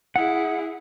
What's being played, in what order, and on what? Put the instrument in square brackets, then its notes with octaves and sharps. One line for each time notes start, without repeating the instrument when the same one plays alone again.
[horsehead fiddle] E4 G#4 [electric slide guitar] F#5